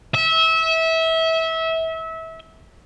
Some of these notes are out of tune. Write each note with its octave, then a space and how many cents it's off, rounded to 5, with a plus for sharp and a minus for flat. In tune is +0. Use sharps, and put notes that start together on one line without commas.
E5 -25